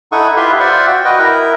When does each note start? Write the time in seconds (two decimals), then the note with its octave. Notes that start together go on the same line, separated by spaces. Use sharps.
0.12 D#4 E4 A4 F#5 C#6 D#6
0.37 E4 F4 G4 B4 E5 C6
0.60 F4 C5 D5 E5 F#5
0.87 F#4 G5
1.05 F#4 B4 D#5 G5
1.19 E4 A#4